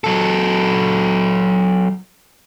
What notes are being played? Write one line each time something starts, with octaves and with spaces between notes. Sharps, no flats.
F#3 A4